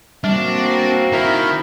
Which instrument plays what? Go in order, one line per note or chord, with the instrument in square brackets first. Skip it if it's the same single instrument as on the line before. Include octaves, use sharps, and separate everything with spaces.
[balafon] G3 [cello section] A#3 C4 F#4 [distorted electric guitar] D4
[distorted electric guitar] D#3 [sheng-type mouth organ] E4 A#4 B5